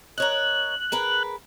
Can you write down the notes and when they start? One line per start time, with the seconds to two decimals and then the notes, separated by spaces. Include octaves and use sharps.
0.18 A#4 C#5 D#5 F#6
0.92 G#4 A#4 B4